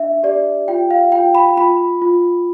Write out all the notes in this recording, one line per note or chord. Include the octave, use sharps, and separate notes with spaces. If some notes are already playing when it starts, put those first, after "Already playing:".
Already playing: D4 E5
G4 D5
F4 G5
F5
F4 G5
B5
F4 B5
F4